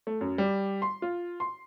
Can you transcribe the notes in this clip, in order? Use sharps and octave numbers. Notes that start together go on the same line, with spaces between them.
A3
F#2
G3
C6
F4
C6